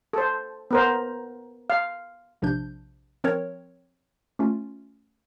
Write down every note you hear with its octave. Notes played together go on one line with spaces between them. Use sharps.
A4 C5
B3 A#4 C5
F5
A#1 C3 F3 D4 G6
F3 C4 A#4 C#5
A3 C#4 F4